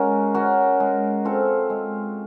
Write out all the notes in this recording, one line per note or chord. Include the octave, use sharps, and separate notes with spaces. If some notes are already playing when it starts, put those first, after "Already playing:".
Already playing: G#3 C#4 F#4 A#4
C#4 F#4 A#4
G#3
C4 F4 A4
G#3